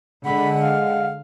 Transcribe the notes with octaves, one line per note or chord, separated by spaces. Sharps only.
D3 G#3 F#5 B5
F5